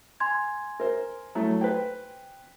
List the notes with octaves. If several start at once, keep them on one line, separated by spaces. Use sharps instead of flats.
G#5 C6 G#6
A#4 C5
F#3 A3 E4
B4 C5 G5